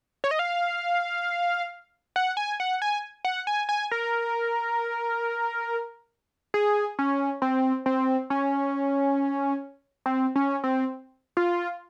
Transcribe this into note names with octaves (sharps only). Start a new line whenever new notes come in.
C#5
D#5
F5
F#5
G#5
F#5
G#5
F#5
G#5
G#5
A#4
G#4
C#4
C4
C4
C#4
C4
C#4
C4
F4